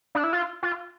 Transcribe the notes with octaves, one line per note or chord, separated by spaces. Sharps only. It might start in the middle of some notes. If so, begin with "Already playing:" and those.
D4
E4
F4
F4